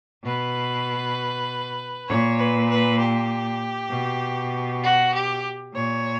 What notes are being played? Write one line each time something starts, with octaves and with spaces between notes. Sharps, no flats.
B2 B4
A#2 C#5
B4
B4
G4
B2
F#4
G4
A#2 C#5